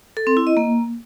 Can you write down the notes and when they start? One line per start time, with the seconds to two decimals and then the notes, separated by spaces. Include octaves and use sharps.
0.17 A4
0.27 C4
0.37 E4
0.47 D#5
0.57 A#3